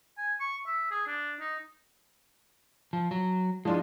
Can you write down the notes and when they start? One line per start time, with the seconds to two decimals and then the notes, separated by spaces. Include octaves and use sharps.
0.17 G#5
0.40 C#6
0.67 E5
0.91 G#4
1.07 D4
1.39 D#4
2.93 F3
3.11 F#3
3.65 F3 G#3 D4 F4